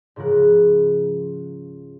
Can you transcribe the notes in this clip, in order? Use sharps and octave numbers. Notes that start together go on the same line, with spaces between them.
G#2 C#3 F3 A#4 F#6